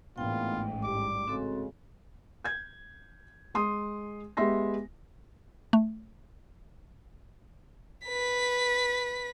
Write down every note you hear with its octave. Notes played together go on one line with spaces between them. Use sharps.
A1 G#2 A#3 B3 D4 F4 G5
G3 D6
C#3 G#3 C4 F#4 A4
G6 G#6
G#3 C6 D#6
G#3 B3 G4 E5 C6 A#6
A3
B4 B6